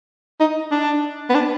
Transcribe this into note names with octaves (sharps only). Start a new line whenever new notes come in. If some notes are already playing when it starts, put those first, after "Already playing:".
D#4
D4
B3
D4